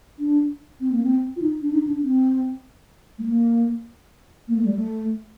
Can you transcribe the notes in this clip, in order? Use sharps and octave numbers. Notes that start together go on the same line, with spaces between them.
D4
C4
A#3
C4
F4
D#4
D4
D#4
D4
C4
A3
A#3
A#3
A3
G3
A3